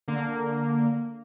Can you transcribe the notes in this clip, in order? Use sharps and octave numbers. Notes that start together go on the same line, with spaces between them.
D3 A#3